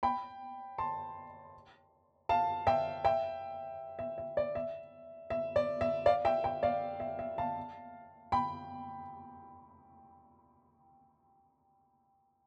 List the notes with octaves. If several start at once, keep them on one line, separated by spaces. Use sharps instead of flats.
G5 B5
A5 C6
F5 A5
E5 G5
E5 G5
E5
E5
D5
E5
E5
D5
E5
D5 F5
E5 G5
E5 G5
D5 F5
E5
E5
F5 A5
G5 B5